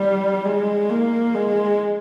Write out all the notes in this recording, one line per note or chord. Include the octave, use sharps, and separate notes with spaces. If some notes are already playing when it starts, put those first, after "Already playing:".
Already playing: G3
G#3
A#3
G#3